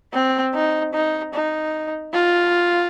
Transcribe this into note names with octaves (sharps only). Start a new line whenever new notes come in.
C4
D#4
D#4
D#4
F4